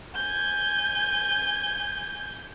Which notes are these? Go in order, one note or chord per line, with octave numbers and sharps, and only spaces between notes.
G#5 G6